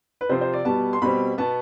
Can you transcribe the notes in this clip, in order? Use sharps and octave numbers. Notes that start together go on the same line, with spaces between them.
B4
C3 F3 C4 C5
C5
D5
B2 G3 B3 A5
C6
B2 G3 C4 B5
B2 B3 A5